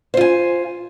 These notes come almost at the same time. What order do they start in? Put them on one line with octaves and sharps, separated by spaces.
C5 F4 G#5